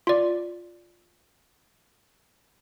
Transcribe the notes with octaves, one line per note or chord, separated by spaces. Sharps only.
F4 D5